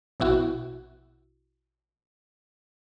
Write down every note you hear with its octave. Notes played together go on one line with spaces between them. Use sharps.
A#1 B2 E4 F#4